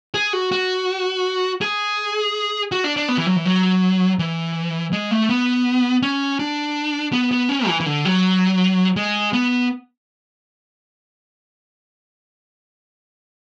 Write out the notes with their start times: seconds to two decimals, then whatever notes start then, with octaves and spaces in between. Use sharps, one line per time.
0.14 G#4
0.33 F#4
0.51 F#4
1.61 G#4
2.72 F#4
2.84 D4
2.97 D4
3.08 B3
3.18 E3
3.26 F#3
3.36 E3
3.45 F#3
4.19 E3
4.92 G#3
5.11 A3
5.29 B3
6.02 C#4
6.39 D4
7.13 B3
7.31 B3
7.49 C#4
7.67 E3
7.80 E3
7.86 D3
8.05 F#3
8.96 G#3
9.33 B3